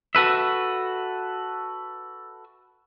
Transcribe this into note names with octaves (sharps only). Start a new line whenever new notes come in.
F#4 A4 B4 E5